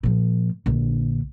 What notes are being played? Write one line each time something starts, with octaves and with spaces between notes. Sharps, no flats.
A#2 F3
A#1 D3